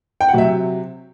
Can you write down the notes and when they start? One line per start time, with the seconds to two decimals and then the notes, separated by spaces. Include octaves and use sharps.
0.21 G5
0.29 F#5
0.33 C3 F#3 E5